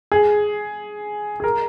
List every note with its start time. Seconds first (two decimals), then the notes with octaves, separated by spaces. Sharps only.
0.12 G#4
1.40 G#4
1.44 A#4